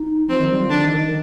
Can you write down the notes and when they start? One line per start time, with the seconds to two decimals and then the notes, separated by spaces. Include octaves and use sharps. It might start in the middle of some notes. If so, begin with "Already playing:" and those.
Already playing: D#4
0.29 F3 C4
0.39 D#3
0.50 G3
0.60 F3
0.69 D3 D4
0.83 D#3
0.97 D#3